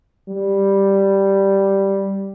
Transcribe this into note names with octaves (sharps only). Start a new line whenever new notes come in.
G3